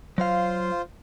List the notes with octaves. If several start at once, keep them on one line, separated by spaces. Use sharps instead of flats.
F#3 F4 C5 F5